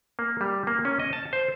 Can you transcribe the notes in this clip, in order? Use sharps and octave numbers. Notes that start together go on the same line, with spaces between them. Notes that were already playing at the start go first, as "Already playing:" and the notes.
A#3
G3
A#3
C#4
D#5
A5
C5